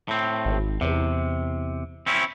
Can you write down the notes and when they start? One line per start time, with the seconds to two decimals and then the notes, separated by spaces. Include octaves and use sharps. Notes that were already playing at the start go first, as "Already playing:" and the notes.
0.08 A2 C4
0.45 G#1
0.81 E2 C3
2.06 C4 C#4 E4